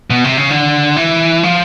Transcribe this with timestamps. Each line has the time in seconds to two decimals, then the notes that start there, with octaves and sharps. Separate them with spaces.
0.10 B2
0.24 C3
0.37 C#3
0.50 D3
0.96 E3
1.43 F3